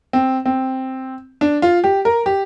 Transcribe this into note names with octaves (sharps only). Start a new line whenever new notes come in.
C4
C4
D4
F4
G4
A#4
G4